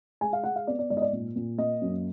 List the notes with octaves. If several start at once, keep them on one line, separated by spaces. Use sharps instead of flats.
G#3 G#5
F5
G#3 F#5
F5
B3 D5
D5
G#2 D5
D#5
D5
A#2
A#2
A#3 D#5
F#2